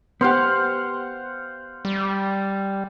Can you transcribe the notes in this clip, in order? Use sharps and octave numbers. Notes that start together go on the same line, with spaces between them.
B3 G4 C5 F5 F#5
G3